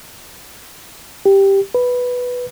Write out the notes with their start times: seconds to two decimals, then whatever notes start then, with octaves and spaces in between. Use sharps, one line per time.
1.26 G4
1.75 B4